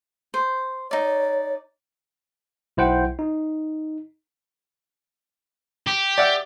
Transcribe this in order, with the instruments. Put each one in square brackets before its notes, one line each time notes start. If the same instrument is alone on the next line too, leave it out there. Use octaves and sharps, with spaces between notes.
[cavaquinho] C5
[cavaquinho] D#4 D5 [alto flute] C#5
[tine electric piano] B1 E4 C5 F#5 G5
D#4
[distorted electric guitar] G4
[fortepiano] D5 E5 F#5